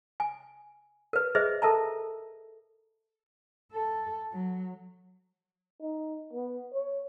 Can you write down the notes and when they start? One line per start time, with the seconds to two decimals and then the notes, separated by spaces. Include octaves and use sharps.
0.20 G#5
1.13 A#4 B4
1.35 G#4 B4 C5 D#5 E5
1.62 A4 A#4 E5 A5 A#5
3.73 A4
4.32 F#3
5.81 D#4
6.33 B3
6.73 C#5